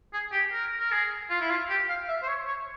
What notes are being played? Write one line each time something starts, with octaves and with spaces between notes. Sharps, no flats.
G#4
G4
A#4
A#4
G#4
F4
E4
F4
G4
F5
E5
C5
C#5
C#5